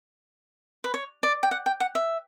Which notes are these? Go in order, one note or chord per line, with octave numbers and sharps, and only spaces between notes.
B4
C#5
D5
G5
F#5
G5
F#5
E5